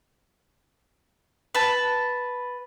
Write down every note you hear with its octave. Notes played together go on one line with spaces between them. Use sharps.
B4 A5